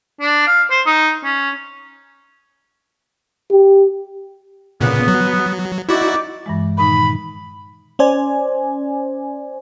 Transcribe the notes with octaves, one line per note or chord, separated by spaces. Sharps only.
D4
F5
C5
D#4
C#4
G4
A#2 C#3 B3
F#3
D#4 E4 F#4 D5
G2 E3 G#3
A#2 D#3 D#4 B5
C#4 C5 D5 G#5